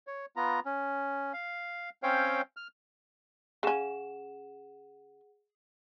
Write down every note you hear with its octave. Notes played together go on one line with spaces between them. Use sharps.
C#5
B3 F4 A#5
C#4
F5
C4 C#4 C5 C#5 F5 G5
F6
C#3 C#4 G#4 F#5 E7